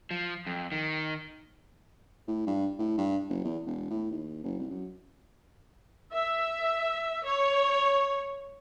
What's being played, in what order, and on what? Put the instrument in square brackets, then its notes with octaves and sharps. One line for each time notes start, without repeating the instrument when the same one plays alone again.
[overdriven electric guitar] F3
F2
D#3
[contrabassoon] A2
G2
A2
G2
F#1
E2
E1
A2
D#2
F#1
C2
F#2
[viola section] E5
C#5